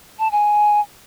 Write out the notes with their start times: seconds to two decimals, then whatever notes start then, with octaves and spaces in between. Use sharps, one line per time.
0.19 A5
0.32 G#5